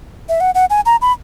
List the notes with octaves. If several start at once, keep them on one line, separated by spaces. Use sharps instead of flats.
E5
F#5
F#5
G#5
A#5
B5